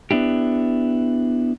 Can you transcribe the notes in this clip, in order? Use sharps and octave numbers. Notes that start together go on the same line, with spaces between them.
B3 D4 E4 G4